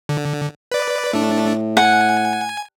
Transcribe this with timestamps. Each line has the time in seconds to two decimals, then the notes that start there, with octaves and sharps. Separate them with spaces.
0.09 D3
0.72 B4 D5
1.13 A2 A3 D4
1.77 F#5 G#5